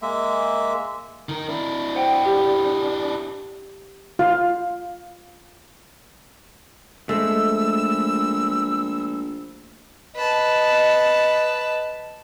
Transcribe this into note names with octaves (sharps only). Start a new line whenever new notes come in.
G#3 A#3 E5
D#3 A#4
D4 E4
C5 F#5 G5
G4
F4 F5
A#1 G#3 A3 E6
B4 D#5 A5